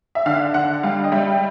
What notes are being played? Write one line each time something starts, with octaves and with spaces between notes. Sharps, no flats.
E5
D3 F5
D3 F#5
G3 F5
D#5
G3 E5